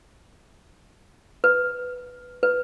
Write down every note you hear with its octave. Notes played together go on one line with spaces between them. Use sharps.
B4
B4